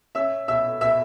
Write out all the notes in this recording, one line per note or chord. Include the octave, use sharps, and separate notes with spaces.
C#4 E5 E6
B2 E5 E6
B2 E5 E6